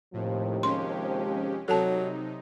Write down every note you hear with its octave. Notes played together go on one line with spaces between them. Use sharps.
D#2 A2 C3 F3
G#3 C#4 G4 C6
C3 F#3 D#4 A4 A5